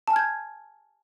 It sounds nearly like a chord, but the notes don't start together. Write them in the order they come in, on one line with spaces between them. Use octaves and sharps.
A5 G#5 F6 G#6 G6